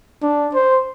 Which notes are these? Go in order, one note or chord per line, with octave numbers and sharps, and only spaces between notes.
D4
C5